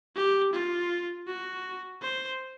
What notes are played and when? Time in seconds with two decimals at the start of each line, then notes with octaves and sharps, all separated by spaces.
0.16 G4
0.53 F4
1.27 F#4
2.02 C5